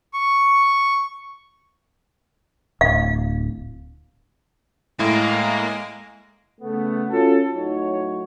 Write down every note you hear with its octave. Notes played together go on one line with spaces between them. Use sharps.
C#6
D1 F5
A2 G#3 A#3 E4
C#3 A3 B3
C#4 F4 F#4 A4
A2 F#3 D#4 C#5